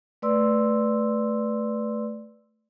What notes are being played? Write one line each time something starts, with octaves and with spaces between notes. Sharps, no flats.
A3 B4 D5 C6 E6